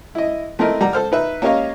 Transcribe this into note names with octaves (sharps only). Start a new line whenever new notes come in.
E4 D#5
A3 C4 E4 A#4 D#5
G3 F#5 A#5
A4 C5 F6
D#4 B4 E5
A#3 C#4 G4 C#5 D#5 F5